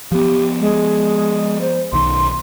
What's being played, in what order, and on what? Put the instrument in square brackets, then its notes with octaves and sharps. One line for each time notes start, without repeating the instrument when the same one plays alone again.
[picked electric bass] F3 B3 [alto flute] G4
[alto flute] G#3
C5
[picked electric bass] B1 D#3 [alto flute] C6